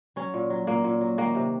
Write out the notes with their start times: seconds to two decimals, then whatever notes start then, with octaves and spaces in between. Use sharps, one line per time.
0.16 F#3 C#4
0.34 A#2
0.50 F#3
0.67 A#2 A#3
0.84 A#2
1.01 F#3
1.18 D#3 A#3
1.35 C3